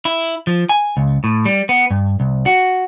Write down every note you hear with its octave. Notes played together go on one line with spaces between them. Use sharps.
E4
F3
G#5
C#2
A2
G3
B3
G2
C2
F#4